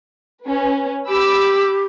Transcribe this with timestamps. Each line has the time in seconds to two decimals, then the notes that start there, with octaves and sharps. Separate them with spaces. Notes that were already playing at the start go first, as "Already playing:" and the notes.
0.45 C#4 B4
1.09 G4 B5 D6 E6